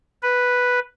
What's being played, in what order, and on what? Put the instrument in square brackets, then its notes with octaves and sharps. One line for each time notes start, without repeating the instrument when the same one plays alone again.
[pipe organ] B4